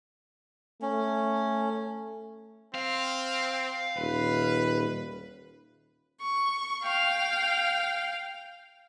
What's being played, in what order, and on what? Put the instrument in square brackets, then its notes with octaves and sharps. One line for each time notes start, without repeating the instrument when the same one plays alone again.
[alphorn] A3 [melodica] C#4
[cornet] C4 [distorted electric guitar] F5
[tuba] D#1 [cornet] B4
[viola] C#6
F5 G5